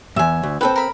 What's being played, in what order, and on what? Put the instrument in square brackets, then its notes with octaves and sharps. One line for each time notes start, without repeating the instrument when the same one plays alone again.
[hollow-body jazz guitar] E2 G2 [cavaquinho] E5 G#5
[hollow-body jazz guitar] D2
[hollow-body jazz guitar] C4 A4 B4 [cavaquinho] G5
[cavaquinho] A#4 B5